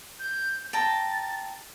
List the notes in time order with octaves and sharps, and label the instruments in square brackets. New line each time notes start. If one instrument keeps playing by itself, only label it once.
[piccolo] G6
[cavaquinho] G5 A5 A#5 [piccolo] A6